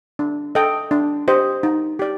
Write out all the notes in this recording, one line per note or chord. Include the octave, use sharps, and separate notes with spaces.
D4
A4 D#5 G5
D4
G4 C5 D#5
D#4
G4 D5